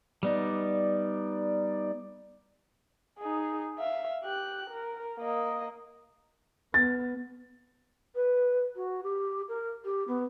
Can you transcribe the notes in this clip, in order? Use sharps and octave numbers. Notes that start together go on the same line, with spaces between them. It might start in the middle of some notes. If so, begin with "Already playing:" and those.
G3 B3 D#4 D5
D#4 G#4
E5 F5
G4 F#6
A#4
A#3 D#5
B3 A6
B4
F#4
G4
A#4
G4
B3